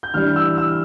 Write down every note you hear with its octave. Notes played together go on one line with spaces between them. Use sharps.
G6
E3 G3 D4 F6
E6
E6